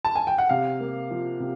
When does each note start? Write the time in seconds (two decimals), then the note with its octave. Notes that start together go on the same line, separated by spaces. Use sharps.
0.05 A5
0.16 G#5
0.27 G5
0.38 F#5
0.49 C3 F5
0.80 A#3
1.11 F3
1.40 C3